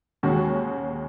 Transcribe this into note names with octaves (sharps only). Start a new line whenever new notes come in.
D#2 D#3 G#3 C#4 F#4